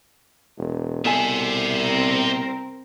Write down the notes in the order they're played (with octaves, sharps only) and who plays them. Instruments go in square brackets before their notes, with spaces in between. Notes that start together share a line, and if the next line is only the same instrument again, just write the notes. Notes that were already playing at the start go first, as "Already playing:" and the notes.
[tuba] E1
[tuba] C2 [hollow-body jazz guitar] B2 A4 G#5 [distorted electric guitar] C5 E5
[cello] C4 A#4